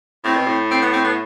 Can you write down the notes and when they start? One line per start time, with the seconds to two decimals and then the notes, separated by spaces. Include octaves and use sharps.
0.24 A2 C4
0.36 B2
0.46 A2
0.71 C4
0.82 B3
0.93 C4
1.04 B3